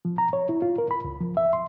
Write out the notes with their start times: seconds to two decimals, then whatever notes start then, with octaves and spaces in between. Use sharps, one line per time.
0.05 F3
0.18 A#5
0.33 C#5
0.49 E4
0.62 F4
0.78 A#4
0.91 B5
1.04 C#2
1.21 F3
1.37 E5
1.53 C6